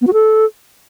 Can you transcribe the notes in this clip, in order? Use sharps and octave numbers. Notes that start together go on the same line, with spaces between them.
B3
F#4
A4